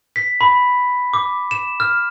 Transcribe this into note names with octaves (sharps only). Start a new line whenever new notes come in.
B6
B5
D6
E7
F6